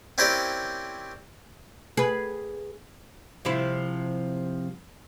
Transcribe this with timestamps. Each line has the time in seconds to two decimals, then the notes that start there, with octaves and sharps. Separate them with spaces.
0.18 C4 C#4 E4 G4 A#4 D5
1.97 G#4 B4
3.45 C3 F3 E4